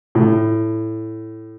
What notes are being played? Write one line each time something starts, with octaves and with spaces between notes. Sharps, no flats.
A2